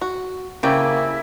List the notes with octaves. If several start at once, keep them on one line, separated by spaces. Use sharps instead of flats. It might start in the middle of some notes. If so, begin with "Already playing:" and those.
F#4
C#3 A#3 C4 E4 G4